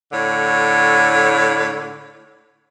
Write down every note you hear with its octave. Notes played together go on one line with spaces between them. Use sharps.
A2 D3 C#5